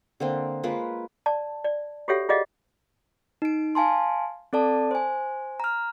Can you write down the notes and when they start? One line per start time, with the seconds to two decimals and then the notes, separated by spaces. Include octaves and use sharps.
0.20 D3 A#3 C4 D#5
0.63 G#3 A#3 F4 B4
1.26 D5 A5
1.65 D5
2.08 F#4 G4 A4 C#5 E5 F#5
2.29 F4 G#4 D5 D#5 F5 F#5
3.42 D#4 D7
3.75 F5 G#5 A5 C6
4.53 C4 A4 D5 A5
4.91 C5 G#5
5.60 A#5 F6